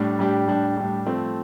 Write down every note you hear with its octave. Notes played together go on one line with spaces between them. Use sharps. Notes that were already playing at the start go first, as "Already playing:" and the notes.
Already playing: A2 G3 D4
A2 G3 D4 G4
A2 G3 D4 G4
A2 G3 D4 G4
F3 A3 C4